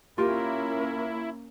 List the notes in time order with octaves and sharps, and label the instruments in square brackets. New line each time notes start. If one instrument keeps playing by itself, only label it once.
[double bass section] A#3 C#4 [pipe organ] E4 [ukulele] F4 G4 [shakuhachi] A#4